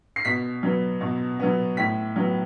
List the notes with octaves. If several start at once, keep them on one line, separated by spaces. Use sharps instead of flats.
C7
B2 B6
F#3 B3
B2
F#3 B3
A2 B6
F#3 B3